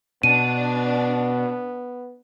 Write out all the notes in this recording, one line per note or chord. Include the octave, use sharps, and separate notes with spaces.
B2 B3 D4 D#7